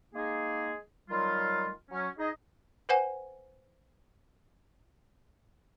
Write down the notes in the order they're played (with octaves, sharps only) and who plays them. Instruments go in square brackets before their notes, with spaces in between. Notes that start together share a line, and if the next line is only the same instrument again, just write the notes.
[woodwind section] G#3 A#3 D#4 G#4
D#3 F#3 G3 A3 F4
F#3 C#4
D#4 G#4 D#5
[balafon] B4 C5 F#5 G#5